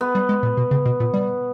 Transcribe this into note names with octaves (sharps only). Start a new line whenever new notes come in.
B3
G3
G#3
A#2
B2
C#3
B2
A#2
G3